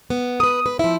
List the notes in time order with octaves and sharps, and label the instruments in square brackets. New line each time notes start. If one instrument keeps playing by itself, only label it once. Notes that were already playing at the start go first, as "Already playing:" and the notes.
[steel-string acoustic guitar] B3
[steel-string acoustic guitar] A#4 B4 [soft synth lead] D#6
[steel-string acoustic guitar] B4
[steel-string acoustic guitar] F3 E4 [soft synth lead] E5